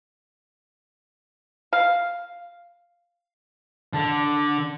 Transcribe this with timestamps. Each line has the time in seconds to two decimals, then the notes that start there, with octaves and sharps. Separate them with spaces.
1.73 F5
3.93 D3